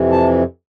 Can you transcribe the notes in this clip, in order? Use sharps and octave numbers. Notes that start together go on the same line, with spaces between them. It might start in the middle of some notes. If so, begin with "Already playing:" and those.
Already playing: F2 C3 E3
A5